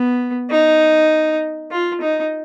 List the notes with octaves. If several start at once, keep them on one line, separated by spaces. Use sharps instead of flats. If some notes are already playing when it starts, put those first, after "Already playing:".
Already playing: B3
D#4
F4
D#4